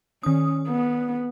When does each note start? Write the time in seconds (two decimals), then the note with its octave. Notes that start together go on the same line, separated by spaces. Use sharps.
0.23 D#3 C#4 D#6
0.68 B3